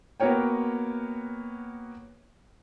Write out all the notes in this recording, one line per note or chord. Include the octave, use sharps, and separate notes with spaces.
A#3 B3 F#4 A#4 C#5 G5